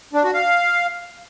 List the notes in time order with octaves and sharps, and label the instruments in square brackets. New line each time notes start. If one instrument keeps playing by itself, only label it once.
[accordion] D4
F#4
F5